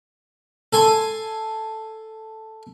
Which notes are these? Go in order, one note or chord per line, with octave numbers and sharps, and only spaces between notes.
A4 G#5 C6